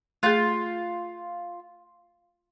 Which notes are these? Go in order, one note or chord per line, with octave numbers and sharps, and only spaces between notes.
A3 F4 G#4